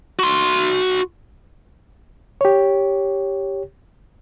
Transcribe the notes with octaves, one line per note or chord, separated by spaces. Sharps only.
F#4 C6
G4 C#5